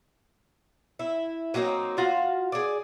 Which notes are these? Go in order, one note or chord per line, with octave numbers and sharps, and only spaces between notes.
E4
F#3 A#3 C4 D#4
F4 F#4 F5
G#4 D5